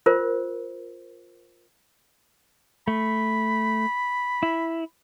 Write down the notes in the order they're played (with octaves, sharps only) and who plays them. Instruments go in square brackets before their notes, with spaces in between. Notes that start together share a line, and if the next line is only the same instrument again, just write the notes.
[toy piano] F4 A#4 C5
[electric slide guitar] A3 [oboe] B5
[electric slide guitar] E4